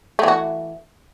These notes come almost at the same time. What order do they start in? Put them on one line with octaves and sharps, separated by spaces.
A3 E3 F#4